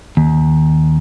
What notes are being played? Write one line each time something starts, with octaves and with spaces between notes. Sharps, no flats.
D#2